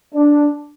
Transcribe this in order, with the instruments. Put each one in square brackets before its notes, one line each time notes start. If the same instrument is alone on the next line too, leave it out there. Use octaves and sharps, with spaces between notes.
[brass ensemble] D4